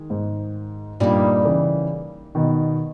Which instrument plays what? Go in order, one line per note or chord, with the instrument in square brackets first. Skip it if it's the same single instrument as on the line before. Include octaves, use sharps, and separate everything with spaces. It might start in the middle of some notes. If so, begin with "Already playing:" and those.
Already playing: [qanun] D#3 G#3
[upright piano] G#2
[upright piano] G2 A#2 [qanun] G3 A#3 D#4
[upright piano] C#3 E3
B2 D#3